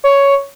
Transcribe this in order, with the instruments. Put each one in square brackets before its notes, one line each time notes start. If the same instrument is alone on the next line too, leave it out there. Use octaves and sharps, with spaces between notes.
[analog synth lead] C#5